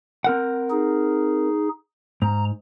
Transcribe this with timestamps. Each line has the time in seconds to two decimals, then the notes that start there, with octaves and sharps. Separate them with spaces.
0.24 C4 A#4 F#5
0.71 D#4 G#4
2.22 G#2 A#5